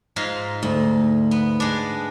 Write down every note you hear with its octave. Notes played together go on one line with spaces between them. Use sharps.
G#2 D#4 F4
D2
B3
G#3 D4